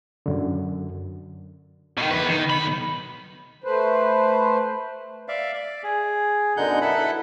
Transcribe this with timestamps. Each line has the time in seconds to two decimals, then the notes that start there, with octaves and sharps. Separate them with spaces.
0.26 F#2 D3
1.98 B2 D#3
2.11 E2 B4
2.28 D#3
2.50 B1 B5
3.64 A3 B4 C5
5.28 D5 E5 F5
5.54 D5
5.84 G#4
6.57 F#2 B2 D3 D#4 F#5 G6
6.81 E4 A4 B4 F#5 B5